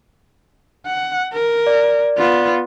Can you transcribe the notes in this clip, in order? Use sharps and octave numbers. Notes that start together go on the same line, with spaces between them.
F#5
A#4
D5
B3 F4